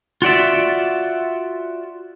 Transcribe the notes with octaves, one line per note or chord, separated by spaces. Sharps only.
F4 F#4 D5 E5